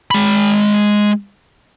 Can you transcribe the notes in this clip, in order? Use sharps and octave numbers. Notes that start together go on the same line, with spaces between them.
G#3 B5